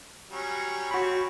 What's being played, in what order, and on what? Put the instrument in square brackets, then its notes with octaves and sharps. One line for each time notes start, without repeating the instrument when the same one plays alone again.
[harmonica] F#3 G3 C#4
[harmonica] C4 C#5 [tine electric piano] F#4 B5